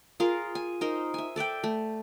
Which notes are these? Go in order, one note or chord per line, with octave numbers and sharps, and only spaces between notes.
F4 G#4 A#4 F5
G#5
D#4 A#4 C5
E5 G#5
A4 D5 E5 G5
A3